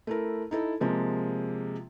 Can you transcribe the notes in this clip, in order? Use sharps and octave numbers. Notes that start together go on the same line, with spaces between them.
A3 E4 A#4
D#4 E4 A4
C3 F3 G#3 A#3